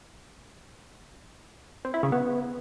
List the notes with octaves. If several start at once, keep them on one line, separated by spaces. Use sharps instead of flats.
C4
E4
C#3
B3